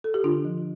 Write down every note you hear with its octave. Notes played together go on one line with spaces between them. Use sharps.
A4
G4
D3 D4 F4
F3